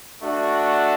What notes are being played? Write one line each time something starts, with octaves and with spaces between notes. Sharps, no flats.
A3 D4 F#4